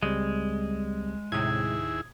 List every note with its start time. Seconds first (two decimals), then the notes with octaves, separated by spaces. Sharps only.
0.03 C#2 G3 G#3 C4
1.32 D#2 A2 C3 E4 G#4 D#6 G#6